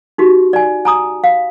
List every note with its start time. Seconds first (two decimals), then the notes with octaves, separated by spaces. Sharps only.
0.18 D#4 F#4 G4
0.53 D5 G#5
0.85 G#5 A#5 D#6
1.24 F5